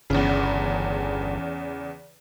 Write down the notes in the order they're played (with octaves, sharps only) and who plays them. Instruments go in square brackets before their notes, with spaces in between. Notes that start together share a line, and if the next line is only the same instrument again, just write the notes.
[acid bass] G1 [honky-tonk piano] E2 C#3